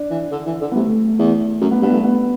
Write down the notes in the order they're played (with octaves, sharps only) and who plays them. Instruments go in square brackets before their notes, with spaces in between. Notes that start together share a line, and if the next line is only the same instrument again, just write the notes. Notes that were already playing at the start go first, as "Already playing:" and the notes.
Already playing: [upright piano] D4
[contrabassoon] E3
D3
E3
D3
[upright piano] B3
[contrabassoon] C3 [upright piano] A3
[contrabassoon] E2
[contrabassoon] F#2 [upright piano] A3
[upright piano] B3
[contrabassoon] G2 [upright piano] B3
[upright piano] A3
B3